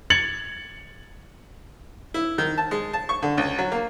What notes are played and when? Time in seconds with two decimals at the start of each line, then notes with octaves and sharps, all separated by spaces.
0.10 G#6 A6 C#7 F#7
2.14 E4
2.38 D#3
2.58 A5
2.71 G#3
2.93 A5
3.09 C#6
3.22 D3
3.37 C#2
3.58 F#3
3.72 A#3